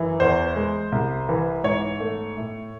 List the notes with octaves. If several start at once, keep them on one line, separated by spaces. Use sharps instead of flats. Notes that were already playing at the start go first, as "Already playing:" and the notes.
Already playing: F#2 E3
E2 C5
G#3
C2
E3
G#2 C#5
A3
A2